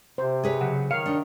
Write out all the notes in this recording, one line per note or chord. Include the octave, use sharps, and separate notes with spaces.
C3 C5
G#4 B4 C#5
C#3 F#3 F#5
D#3 C#5 F5
D4 D#4